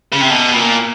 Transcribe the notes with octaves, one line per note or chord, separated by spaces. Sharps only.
C#3
C3
B2
A#2